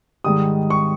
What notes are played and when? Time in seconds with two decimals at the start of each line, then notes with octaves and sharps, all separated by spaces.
0.24 G#2 D#3 G3 D#6
0.70 C#6